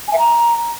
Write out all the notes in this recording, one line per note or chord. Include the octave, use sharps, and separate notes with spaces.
G#5
E5
A#5